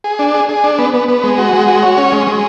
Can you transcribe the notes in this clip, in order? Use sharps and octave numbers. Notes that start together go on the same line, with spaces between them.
G#4
D4
G#4
G#4
D4
B3
B3
B3
G#3
F#4
G#3
F#4
C#5
C#4
G#3
G#3